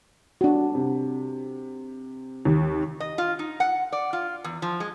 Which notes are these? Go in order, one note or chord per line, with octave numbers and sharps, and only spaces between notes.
D4 F#4
C3
D#2 D#3
D#5
F4
D#4
F#5
D5
F4
E2
F3
G#3